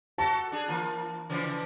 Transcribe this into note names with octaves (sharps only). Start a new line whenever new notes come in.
F#4 A4 A5
D4 G#4
E3 A#3 F4
C#3 E3 F3